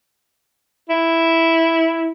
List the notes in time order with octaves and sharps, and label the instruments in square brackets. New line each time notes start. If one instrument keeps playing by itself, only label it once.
[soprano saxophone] E4